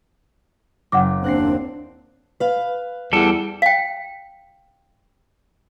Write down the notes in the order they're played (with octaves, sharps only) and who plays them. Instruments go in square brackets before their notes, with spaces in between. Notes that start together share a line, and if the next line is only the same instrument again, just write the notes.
[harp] F#1 A#6 [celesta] F#5 D6
[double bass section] D#2 C4 [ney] D4 [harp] F#6 A#6 C7
[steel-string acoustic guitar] B4 F5
[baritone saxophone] E2 [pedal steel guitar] G3 A4
[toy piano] F5 G5